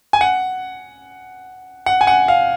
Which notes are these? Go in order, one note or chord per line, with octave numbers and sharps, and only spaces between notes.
G#5
F#5
F#5
G#5
F#5
F5